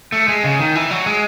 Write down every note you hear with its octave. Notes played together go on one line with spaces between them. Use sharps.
A3
G#3
C#3
D#3
E3
F#3
G#3